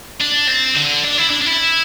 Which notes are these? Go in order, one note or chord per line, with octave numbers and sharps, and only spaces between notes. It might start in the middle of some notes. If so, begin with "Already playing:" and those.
D4
C4
D3
D4
E4
D4
D4
E4